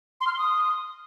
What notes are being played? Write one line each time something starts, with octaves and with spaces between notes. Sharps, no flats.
C6
F6
C6
D#6